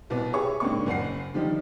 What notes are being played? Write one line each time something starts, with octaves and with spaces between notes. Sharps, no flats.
C2 B2 B3 D6
G4 G#4 C#5 E5 C#6
G#2 C#3 A#3 C4 D4 C#6
F#1 F#2 F#5 C7
D3 D#3 F3 G3 D4 D#4